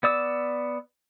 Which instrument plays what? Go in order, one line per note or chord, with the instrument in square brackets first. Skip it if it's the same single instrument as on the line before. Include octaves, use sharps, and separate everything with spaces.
[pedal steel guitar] B3 D5 E6